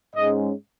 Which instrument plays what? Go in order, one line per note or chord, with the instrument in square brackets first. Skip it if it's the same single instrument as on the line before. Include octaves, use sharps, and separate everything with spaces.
[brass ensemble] G#2 G#3 C#4 D#5